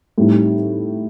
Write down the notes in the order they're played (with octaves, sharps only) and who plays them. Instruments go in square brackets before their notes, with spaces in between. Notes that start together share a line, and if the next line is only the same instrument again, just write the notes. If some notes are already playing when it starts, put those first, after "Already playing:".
[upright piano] A2 G3 C4 D#4